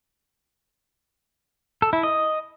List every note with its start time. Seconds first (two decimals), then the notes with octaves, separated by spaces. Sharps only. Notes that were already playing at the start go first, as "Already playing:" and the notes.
1.82 A4
1.93 E4
2.03 D#5